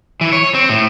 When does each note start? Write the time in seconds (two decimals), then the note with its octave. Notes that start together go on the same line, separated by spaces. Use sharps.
0.21 E3
0.33 C#5
0.54 C4
0.69 A2